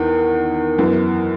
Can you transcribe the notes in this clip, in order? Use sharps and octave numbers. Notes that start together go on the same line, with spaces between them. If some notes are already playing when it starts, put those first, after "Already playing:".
Already playing: E2 D#3
F#2 E3 B3